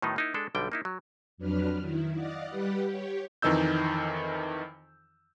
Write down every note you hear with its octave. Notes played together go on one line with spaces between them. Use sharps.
A2 D#3 F#3 B3 D#4
A#3 D#4 E4
G#3 D4 A4
B1 D3 G3 G5
A#3 D#4 E4
F#3
F2 F#3 D4 B4 F6
D#3 E4
D5 D#5 F5 F#5
G3 G4 B4 F#5
G4 C#5
F2 D#3 E3 D#4 E6 G6